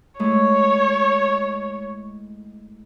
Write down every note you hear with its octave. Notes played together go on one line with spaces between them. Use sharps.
G#3 A3 E4 C#5